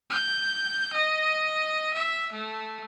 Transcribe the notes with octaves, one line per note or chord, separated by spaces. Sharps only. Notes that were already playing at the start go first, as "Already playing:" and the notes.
G6
D#5
E5
A3